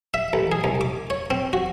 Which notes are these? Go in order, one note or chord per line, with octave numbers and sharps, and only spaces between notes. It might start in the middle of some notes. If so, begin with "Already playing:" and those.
E5
A1
G#4
C2
D6
C#5
C4
F#4